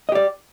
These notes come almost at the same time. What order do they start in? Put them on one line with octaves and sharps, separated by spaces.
D#5 G4 D5